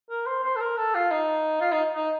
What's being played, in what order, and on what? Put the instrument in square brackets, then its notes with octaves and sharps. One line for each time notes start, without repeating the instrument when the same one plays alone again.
[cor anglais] A#4
C5
C5
A4
A#4
A4
F4
D#4
F4
D#4
D#4